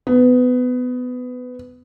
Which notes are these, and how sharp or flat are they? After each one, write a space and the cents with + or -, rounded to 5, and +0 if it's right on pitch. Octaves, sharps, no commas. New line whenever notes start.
B3 +20